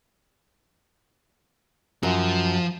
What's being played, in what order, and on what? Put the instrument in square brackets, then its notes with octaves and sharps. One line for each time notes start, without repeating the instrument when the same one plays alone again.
[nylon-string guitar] F#2 [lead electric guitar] F3